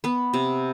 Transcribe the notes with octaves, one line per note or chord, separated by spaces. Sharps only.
B3 B4
C3